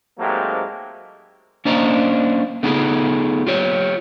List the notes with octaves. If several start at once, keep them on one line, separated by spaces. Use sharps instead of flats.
G#2 F#3 A3 A#3 C4 G4
A#3 C#4 D4 C5 D#5 A#5
A3 B3 D#4 G#4
F4 G4 C#5